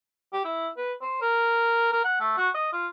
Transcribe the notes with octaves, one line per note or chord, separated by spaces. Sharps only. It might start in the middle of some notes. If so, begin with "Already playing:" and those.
G4
E4
B4
C5
A#4
A#4
F#5
A3
F#4
D#5
F4